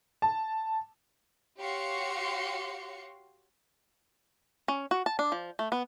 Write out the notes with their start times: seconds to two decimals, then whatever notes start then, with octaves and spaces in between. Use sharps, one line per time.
0.22 A5
1.59 F#4 G4 C#5 F5 C6 C#7
4.68 C#4
4.91 F#4
5.06 A5
5.19 D4
5.32 F3
5.59 A3
5.72 B3